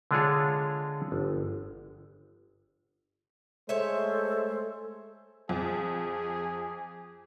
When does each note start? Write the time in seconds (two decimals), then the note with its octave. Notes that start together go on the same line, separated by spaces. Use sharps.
0.11 D3 G#3 D4 F4 G#4 C#5
1.12 G1
3.69 G#3 A3 A4 C5 C#5 E5
5.49 F2 G#4